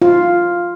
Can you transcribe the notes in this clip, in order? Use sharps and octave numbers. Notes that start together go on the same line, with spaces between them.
F4